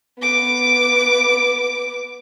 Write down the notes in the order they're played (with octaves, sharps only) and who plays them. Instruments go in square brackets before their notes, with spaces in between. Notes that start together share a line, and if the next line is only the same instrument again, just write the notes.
[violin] B3 D6